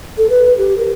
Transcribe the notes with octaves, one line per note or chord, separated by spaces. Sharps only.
A4
B4
G4
A#4